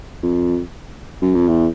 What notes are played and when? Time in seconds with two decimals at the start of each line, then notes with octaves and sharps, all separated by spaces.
0.23 F2
1.22 F#2
1.35 F2
1.48 E2